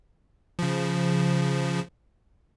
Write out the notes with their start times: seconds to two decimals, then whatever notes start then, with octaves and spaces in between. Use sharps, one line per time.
0.59 C#3 F3